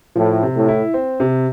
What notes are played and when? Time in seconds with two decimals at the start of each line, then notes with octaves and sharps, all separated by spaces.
0.16 A2 F3
0.42 C3
0.55 A2
0.68 E4
0.94 C4
1.20 C3